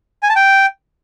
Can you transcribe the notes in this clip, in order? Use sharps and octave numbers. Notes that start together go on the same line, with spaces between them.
G#5
A5
G5